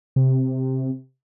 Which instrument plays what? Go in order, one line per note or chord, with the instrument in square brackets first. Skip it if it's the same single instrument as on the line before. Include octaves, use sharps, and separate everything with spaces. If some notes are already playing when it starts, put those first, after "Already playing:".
[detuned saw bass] C3